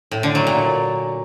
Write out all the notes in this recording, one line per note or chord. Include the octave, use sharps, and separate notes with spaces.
A2
D3
F#3
A#2